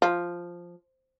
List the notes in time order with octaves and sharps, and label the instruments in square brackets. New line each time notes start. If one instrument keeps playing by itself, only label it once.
[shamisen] F3